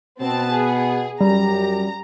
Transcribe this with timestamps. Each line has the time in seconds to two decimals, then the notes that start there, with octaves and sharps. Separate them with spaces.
0.20 B2 B3 C4 A5
0.50 G#4
1.21 F#2 G3 G4 A#5